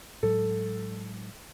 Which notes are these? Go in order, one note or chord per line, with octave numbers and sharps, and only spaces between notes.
A2 F#3 G#3 A4